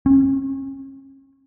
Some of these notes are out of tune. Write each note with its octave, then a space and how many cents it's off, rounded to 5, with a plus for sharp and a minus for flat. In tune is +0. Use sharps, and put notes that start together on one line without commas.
C#4 -40